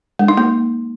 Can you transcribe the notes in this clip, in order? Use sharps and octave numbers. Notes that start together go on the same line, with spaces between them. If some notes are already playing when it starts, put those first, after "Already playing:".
G#3
D#4
A#3